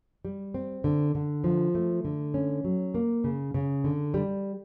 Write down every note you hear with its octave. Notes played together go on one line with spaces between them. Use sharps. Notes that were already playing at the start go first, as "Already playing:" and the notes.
G3
C4
D3
D3
F3
A3
D3
C#4
F#3
A#3
C#3
C#3
D3
G3